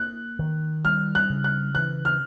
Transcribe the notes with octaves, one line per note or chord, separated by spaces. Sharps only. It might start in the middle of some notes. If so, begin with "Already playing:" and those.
Already playing: A#3 F#6
D#3
G3 F6
F#6
C#3
F#6
E3 F#6
F6